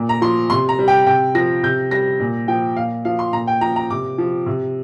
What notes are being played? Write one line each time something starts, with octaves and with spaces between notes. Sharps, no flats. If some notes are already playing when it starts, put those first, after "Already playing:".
Already playing: A#2
A#5
F3 C6
C3 C6
A#5
G3
G5
C3 G5
F3 A#6
C3 G6
G3 A#6
A#2
F3 G5
A#2 F5
F3 F5
C6
A#2 A#5
G5
F3 A#5
A#5
C3 D6
F3
C3